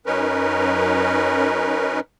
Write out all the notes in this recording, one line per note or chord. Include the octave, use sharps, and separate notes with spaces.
F#2 C#4 D#4 A#4 B4